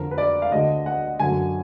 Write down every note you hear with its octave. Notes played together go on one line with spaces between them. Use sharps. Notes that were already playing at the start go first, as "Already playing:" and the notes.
Already playing: F2 D3 A#4
B4
D5
F5
D2 D3 D#5
F#5
F#2 D3 G#5